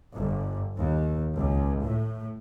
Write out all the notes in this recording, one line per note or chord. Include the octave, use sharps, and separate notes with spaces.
G1
D#2
C#2
A2